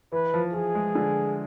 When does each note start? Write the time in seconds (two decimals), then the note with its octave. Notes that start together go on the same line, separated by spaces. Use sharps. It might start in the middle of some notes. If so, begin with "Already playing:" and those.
0.12 E3 B4
0.34 F3
0.54 F3 G#4
0.75 G#3
0.95 D3